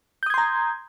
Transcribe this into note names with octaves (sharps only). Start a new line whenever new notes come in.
A#5 C6 D#6 G6 G#6